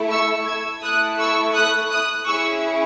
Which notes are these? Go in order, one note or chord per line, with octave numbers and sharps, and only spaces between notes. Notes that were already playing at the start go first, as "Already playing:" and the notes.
Already playing: A3 E4 A4
C#6 E6
E6 G#6
A3 E4 A4 D#6 F#6
C#6 E6
D#6 F#6
D#6 F#6
C#4 E4 G#4 C#6 E6